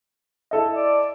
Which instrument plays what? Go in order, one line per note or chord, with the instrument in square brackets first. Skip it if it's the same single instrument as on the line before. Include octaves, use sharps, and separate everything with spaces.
[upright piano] E4 A4 D#5
[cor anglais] D5